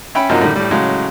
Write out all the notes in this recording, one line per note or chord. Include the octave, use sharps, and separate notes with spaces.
C#4 E5 G5 B5
F#2 C3 F3 A#3 D#4 F#4
A2 D3 D#3 G3
A2 G3
A2 C#3 F#3 G#3